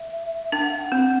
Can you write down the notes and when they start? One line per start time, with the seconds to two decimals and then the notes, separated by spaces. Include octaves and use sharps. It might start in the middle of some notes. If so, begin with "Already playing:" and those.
Already playing: E5
0.52 D4 G5
0.61 F#5
0.70 F5
0.78 G5
0.82 F#5
0.92 C4